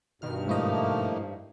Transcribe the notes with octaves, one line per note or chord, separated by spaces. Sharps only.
G2 B2 D#3 F6
G#2 F3 A3 A#3 E4 D#5